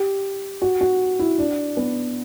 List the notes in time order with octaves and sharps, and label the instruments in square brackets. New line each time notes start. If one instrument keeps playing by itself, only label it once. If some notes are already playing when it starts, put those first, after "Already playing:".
Already playing: [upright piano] G4
F#4
F#4
E4
D4
B3